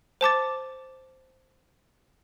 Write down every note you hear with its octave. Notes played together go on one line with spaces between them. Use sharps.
C5 A5 D6 A6